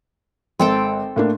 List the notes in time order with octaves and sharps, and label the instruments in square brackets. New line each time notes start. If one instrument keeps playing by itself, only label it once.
[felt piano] G#1 [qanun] C4 A4 G5
[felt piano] A2 A#3 D4